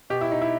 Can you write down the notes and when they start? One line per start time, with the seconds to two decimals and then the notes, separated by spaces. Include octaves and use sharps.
0.10 B2 G4
0.21 E4
0.31 D#4
0.42 E4